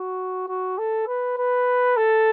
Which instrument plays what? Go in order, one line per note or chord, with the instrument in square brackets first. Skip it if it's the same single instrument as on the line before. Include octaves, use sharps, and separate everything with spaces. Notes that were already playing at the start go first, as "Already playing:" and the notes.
Already playing: [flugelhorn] F#4
F#4
A4
B4
B4
A4